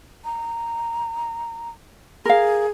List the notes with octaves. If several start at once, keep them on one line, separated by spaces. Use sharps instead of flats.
A#5
G#4 A#4 F5